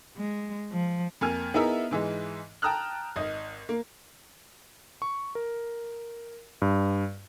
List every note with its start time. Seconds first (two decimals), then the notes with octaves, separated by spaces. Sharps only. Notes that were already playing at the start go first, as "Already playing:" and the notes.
0.17 G#3
0.71 F3
1.21 F2 A#3 G#5 F6
1.54 B3 D#4 E4 G#4 A#4 E5
1.91 G#2 E3 G#3
2.62 G5 A5 A#5 D#6 F6 F#6
3.16 G#1 D#5
3.69 A#3
5.02 C#6
5.35 A#4
6.62 G2